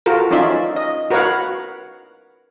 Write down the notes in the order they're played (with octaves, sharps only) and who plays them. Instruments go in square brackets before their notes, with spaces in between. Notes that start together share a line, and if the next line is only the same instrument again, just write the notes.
[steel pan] F4 F#4 A4 A#4
C#4 D#4 F4 D5 E5
D#5
F#4 A#4 B4 C#5 F5 F#5